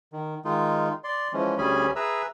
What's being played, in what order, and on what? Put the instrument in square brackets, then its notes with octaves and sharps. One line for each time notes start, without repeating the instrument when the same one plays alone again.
[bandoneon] D#3
D#3 G#3 D#4 F4
D5 C6
E3 F3 G#3 C#4
D2 G3 C#4 G#4 G#5 B5
G#4 B4 E5 A#5 E6